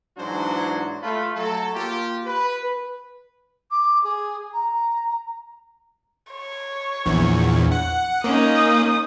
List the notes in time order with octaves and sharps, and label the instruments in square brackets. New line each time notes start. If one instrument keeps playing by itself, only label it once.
[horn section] G#2 E3 F#3 D4 F#4 C5
A3 F4 B4
F#3 A3 A4
A#3 F4 G4
B4
[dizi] D6
G#4
A#5
[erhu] C#5
[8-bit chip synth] A#1 E2
F#5
[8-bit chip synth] A#3 [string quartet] C#4 D#4 [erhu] D#6